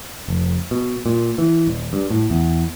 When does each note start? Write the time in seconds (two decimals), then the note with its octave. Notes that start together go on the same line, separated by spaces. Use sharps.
0.28 F1
0.71 B2
1.06 A#2
1.38 E3
1.67 D#1
1.93 G2
2.10 A2
2.30 E2